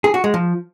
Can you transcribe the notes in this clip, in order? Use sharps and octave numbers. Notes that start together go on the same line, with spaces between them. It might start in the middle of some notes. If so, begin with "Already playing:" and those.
G#4
F#4
G#3
F3